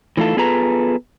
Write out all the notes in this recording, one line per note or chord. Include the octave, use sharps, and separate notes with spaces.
E3 A3 D#4 F4 A4
B3 F4 G#4 A4 B4 A#5